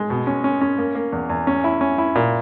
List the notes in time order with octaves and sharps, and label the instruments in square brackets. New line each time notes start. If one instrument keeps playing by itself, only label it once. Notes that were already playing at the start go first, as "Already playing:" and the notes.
Already playing: [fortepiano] G#3
B2
C#4
C#4
C#4
A#3
A#3
E2
E2
C#4
E4
C#4
E4
A#2